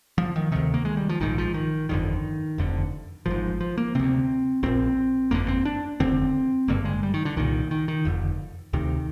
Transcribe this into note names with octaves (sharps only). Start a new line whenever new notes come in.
F3
D#3
D2 C3 D#3
A#3
G#3
G3
F3
A#1 G#2 D#3
F3
D#3
G1 F2 D3 D#3
F1 F2 D3
G#1 G#2 F3
F3
A#3
D2 C3 C4
A#1 A#2 C4
G1 F2 D3 A#3
C4
D4
F1 D#2 D3 C4
G#1 G2 D3 A#3
G#3
G3
D#3
D3
C2 A#2 D#3
D#3
D#3
F1 F2 D3
D2 C3 D#3